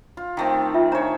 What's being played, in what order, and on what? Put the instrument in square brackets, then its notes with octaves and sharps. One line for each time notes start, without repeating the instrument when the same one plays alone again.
[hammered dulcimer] F4
D#3 A3 C4
[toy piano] F4 E5
[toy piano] D4 A#5 [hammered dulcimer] C5 C#5